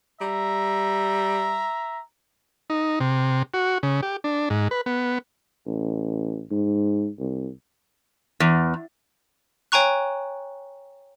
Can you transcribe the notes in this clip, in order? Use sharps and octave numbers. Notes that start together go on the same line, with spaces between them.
G3 E5 A#5
D#4
C3
F#4
C#3
G4
D4
G#2
B4
B3
A1
G#2
C2
E2
C#5 G5 G#5 A#5 C#6 F#6